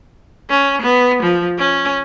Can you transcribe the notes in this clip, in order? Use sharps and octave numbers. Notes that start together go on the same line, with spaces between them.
C#4
B3
F3
C#4